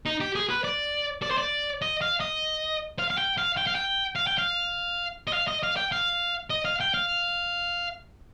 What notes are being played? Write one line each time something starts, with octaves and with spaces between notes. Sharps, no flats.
D#4
G4
G#4
B4
D5
D5
C5
D5
D#5
F5
D#5
F5
F5
G5
F5
G5
F5
G5
F5
G5
F5
D#5
F5
D#5
F5
G5
F5
D#5
F5
G5
F5